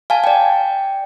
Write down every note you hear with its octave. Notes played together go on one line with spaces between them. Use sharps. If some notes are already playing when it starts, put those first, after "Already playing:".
F5 G#5 A5
D5 G5